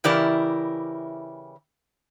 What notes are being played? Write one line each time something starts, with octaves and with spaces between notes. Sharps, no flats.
C#3 E3 E4 G4 A#4 D5